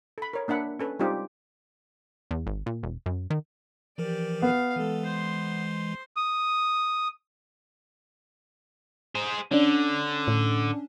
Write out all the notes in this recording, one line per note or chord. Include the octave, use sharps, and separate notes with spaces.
A4 B5
A#4 C#5
A#3 D4 E5 F#5 B5
C#4 A4 B4
G3 G#3 C4 D#4 F4 G4
E2
G#1
A#2
E1
F#2
D#3
E3 F3 G4 A#4 D5
B3 F5
E3 G#3 A4
C5 C6
D#6
G#4 C5
D3 C#4 D4
A2